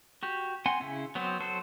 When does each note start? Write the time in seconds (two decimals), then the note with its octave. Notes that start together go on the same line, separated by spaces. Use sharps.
0.23 F#4 G4
0.66 C4 F#5 G#5 C6
0.81 C#3 E4
1.15 F#3 B3 C4 C5
1.40 F#3 A4 C5